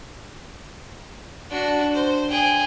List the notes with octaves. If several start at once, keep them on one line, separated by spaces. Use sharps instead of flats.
D4 F#4
C5
G#4 G5